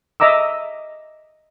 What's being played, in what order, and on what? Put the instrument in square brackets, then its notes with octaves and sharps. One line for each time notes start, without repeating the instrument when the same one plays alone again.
[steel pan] D#5 E5 A#5 D6 E6